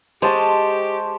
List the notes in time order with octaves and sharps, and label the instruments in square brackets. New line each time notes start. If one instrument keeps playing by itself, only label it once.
[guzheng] G#3 [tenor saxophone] G4 [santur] C5 A5 C#6